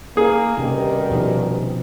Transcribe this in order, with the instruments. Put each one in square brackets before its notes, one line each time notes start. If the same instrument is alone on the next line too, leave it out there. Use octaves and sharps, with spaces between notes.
[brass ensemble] A#3 [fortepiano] G#4
[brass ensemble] D2 G2 D#3 [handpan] C3 C#4 G4
[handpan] B2 F3 D#4